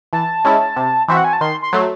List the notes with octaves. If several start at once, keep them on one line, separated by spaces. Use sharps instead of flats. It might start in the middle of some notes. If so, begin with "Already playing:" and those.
E3 A5
G#3 C#4 E4
C3
E3 C4 F#4 E5
F#5
G#5
A5
D#3 C6
C6
F#3 A3